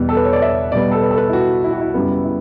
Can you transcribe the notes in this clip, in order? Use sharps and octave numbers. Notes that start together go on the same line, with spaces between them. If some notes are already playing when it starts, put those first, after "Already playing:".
Already playing: E2 B2 G3 B3
A4
B4
C#5
D5
E5
B2 G3 B3 D5
A4
B4
A4
B4
E4
F#4
E4
F#4
E4
F#2 C#3 G3 B3
E4